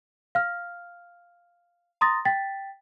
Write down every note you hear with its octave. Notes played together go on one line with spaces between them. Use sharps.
F5 F6
A#5 C6 D#6 A6 A#6
G5 A6 B6